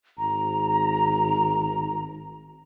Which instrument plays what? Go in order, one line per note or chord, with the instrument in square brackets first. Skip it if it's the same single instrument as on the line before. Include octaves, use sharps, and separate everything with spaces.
[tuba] G#1 [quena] A#5